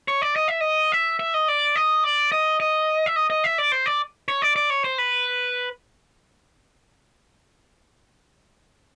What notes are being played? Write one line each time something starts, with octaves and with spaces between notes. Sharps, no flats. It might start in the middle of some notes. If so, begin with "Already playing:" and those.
C#5
D5
D#5
E5
D#5
E5
E5
D#5
D5
D#5
D5
D#5
D#5
E5
D#5
D#5
E5
D5
C5
D5
C#5
D5
D5
C#5
C5
B4